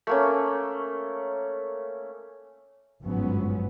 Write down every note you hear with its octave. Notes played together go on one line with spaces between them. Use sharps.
A3 A#3 C#4
G1 G#2 F3 F#3 B3 C#4